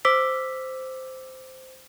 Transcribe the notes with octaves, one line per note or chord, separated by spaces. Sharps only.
C5 D6 E6 B6